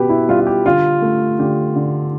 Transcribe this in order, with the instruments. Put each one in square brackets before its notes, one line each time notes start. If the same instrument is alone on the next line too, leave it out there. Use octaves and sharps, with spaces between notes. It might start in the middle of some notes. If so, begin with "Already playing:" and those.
Already playing: [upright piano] B2 [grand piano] G4 B4
[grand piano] E4
[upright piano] G3 [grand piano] F4
[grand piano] F4
G4
[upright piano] D3 [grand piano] F4
[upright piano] A3
[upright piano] D3 [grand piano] G4
[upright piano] D3